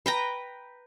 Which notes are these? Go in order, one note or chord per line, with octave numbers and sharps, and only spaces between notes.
B4 G5 A#5